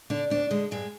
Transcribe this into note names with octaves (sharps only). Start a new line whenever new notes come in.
D3 D4
D2 D4
D3 G#3
G2 G#3